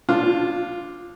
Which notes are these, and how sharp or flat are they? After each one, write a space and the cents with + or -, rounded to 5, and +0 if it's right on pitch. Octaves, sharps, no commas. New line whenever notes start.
F3 +30 D4 +0 F4 +0